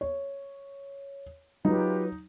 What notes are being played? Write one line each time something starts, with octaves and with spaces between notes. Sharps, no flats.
C#5
F#3 D#4 F4 G4 B4